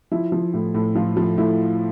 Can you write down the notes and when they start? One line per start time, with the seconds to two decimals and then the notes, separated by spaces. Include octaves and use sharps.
0.11 F3 E4
0.32 F3
0.54 A2
0.74 A2
0.95 F3 F4
1.17 F3
1.38 A2 E4